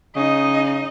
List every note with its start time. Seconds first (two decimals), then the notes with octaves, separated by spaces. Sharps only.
0.16 C#3 D#4 D#5